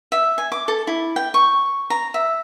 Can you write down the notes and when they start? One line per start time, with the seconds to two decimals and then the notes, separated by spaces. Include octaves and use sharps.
0.12 E5
0.38 G#5
0.52 D6
0.68 A4
0.87 E4
1.16 G5
1.34 C#6
1.90 A#5
2.14 E5